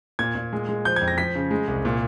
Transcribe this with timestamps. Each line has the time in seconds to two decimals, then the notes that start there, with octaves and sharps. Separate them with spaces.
0.19 A#2 G#6
0.35 A#2
0.53 G#3
0.69 G#3
0.85 F3 G6
0.96 F2 G#6
1.08 A#6
1.18 F3 B6
1.35 C#3
1.51 G#3
1.68 C2
1.85 A#2